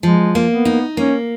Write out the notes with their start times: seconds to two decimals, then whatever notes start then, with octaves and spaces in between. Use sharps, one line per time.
0.03 F3 G#3
0.35 A#3
0.51 B3
0.65 D#4
0.97 A#3 C#4